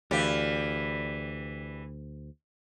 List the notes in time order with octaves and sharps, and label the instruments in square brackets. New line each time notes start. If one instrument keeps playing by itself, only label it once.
[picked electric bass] D2 [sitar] E3 G4 [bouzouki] D5 F5